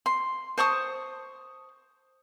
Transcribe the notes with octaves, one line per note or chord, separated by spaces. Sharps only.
C6
C5 A5 C#6 D#6